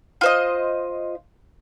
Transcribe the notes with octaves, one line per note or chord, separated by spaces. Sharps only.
F4 C5 D#5